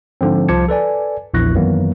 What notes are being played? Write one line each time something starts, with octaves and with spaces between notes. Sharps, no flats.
G#2 D3 F3 C4
C2 F3 A5 D6 G#6 C#7
A4 B4 D5 G#5
A#1 E2 E4 C#6 F#6 A#6
F#2 D#3 E3 F#3 A#3 B3